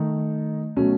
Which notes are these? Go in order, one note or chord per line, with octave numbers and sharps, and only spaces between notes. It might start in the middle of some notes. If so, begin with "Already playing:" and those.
Already playing: D#3 A3 D#4
B2 F#3 A3 C#4